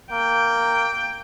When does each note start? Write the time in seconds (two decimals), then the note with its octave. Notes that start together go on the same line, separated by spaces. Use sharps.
0.12 A#3 G5